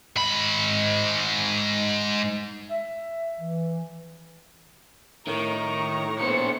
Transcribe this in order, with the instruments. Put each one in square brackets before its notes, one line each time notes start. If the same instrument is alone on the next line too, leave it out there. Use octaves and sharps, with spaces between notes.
[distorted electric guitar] G#2 B5
[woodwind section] E5
E3
[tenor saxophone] A2 [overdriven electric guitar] D#3 [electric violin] A#5 C#6
[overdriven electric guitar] A#2 C5 [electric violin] B3 C#7